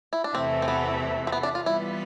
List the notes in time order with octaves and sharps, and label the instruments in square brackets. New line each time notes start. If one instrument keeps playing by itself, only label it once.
[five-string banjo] E4
D4
[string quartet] E2 C3 E3 A3 E4 [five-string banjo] C4
[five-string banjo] C4
B3
C4
B3
D4
F4
[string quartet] E3 G3 B3 F4 B4 [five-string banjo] E4